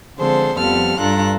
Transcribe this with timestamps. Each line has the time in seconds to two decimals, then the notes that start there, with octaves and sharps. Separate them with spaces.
0.19 D3 F3 G#3 C4 A4 C5
0.58 F2 F3 G3 B3 A4 F6
1.00 G2 D4 F4 A4 A#5 F#6